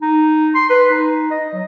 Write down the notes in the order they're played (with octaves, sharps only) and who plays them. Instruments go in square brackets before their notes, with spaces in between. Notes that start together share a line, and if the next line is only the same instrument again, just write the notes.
[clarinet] D#4
C6
B4
D#4
D#5
F#3